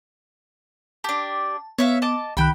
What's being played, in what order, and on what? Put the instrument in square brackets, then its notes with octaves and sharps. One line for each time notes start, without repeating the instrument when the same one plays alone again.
[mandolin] D4 G4 [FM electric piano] A5
[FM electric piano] B3 [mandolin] C#5 E5 F5
[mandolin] D#5 A5 D6
[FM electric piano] C2 D#3 F#6 [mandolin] G5 B5